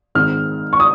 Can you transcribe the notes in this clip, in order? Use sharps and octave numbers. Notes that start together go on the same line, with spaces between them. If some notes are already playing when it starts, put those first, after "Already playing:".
G#1 G#2 D#3 F6
C#6
D#6